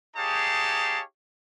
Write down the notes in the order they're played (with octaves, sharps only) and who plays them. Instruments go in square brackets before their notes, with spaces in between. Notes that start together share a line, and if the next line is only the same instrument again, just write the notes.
[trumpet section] D#4 G4 G#4 C#5 F5 A5